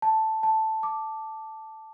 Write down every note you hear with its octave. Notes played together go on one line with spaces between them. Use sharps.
A5
A5
D6